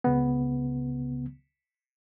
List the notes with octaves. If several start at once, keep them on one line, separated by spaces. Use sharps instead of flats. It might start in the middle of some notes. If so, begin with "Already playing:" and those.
C#2 C#3 B3